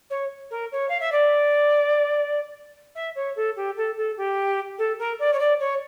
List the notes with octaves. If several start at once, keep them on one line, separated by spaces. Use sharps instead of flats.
C#5
A#4
C#5
F5
E5
D5
E5
C#5
A4
G4
A4
A4
G4
A4
A#4
D5
C#5
D5
C#5